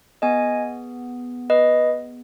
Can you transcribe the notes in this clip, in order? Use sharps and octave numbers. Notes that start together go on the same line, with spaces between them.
B3 G#4 D#5 G#5
B4 D#5